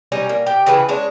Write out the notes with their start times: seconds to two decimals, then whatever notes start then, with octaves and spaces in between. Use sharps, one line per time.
0.12 G3 C#4 D#4
0.29 A#3
0.46 G4 G5
0.66 C#3 E3 B4
0.89 G#3 C#4 D4